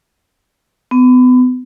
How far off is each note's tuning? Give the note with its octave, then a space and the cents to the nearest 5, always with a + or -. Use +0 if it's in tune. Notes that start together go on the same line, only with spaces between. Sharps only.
B3 +30